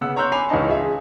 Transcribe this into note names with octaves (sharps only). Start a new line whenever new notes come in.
C#3 B3 F#5 E6
C#5 A#5 C6 E6 F#6 G6
G#5 B5 D6 C7 F7
C#2 E3 C#4 D#4 D#5 A5
F4 G#4 E5